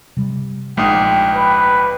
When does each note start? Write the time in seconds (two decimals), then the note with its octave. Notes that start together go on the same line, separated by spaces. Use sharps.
0.17 C3 G3
0.77 A#1 G#2 A3 G5 D#6
1.35 B4